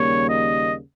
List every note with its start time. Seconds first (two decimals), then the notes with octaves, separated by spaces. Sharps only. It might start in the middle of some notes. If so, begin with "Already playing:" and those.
Already playing: D#2 C#3 G3 A#3 C#5
0.29 D#5